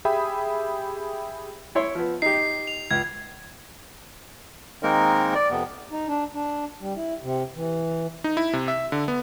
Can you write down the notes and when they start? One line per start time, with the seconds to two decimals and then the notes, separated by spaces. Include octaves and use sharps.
0.05 G4 G#4 E5 G5 B5 D#6
1.75 E4 C#5 C6
1.95 F3 B3
2.22 D#4 G4 C7
2.67 F7
2.91 C#2 G#6
4.83 D#3 G#3 A#3 C4 D#4 A#4
5.35 D5
5.51 F2 C3 B3
5.92 D#4
6.08 D4
6.34 D4
6.81 G3
6.96 E4
7.22 C3
7.55 E3
8.24 D#4
8.37 E4
8.53 C3
8.68 E5
8.92 D3
9.08 B3